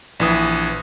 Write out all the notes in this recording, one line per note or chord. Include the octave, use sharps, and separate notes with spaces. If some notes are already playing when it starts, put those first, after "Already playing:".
A#1 E3 D#6